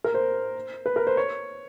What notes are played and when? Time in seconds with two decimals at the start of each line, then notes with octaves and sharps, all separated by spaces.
0.04 A#4
0.14 C5
0.86 B4
0.96 A#4
1.07 C5
1.17 C#5